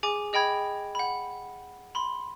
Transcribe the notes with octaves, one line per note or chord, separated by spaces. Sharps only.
G#4 G#5 D6
G#4 D#5 G5 B5 G#6
F#5 B5
B5 C6